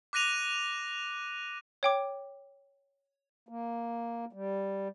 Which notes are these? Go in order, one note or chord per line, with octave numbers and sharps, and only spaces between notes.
D6 F#6 A#6 D#7 F7
C#5 G5 D6
A#3
G3